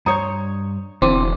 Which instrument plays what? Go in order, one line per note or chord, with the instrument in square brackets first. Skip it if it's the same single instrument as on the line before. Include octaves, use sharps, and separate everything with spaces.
[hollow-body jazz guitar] G2 C5 C#5 [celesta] A#5 D#6
[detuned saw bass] E1 [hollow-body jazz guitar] D3 E3 [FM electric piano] C4 [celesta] C6 D6 D#7